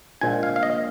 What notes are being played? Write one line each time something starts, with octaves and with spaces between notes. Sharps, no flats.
A#1 A#2 F3 G#3 G#5
F5
F5
D#5